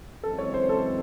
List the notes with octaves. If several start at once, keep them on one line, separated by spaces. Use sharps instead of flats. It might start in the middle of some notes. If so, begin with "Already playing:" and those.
F#2 C#3 E3 G#3 C4 A4
C#5
C5
A4